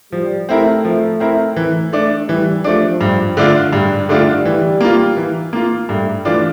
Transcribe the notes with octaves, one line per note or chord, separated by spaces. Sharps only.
F3 G3
A3 C4 E4 A#4
F3
C4 E4 A#4
E3
A3 D4
E3 G3
F3 A3 D4
G2
D3 A3 D4 F4
G2 G3
D3 G3 A3 D4 F4
E3
A#3 F4
E3
A#3 F4
G2 A3
E3 A3 D4 F4